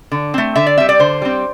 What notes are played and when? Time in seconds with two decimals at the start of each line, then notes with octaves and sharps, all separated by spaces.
0.12 D3
0.34 A3 C4
0.56 D3 E5
0.67 D5
0.77 G3 C4 E5
0.89 D5
0.99 D3 C5
1.22 G3 C4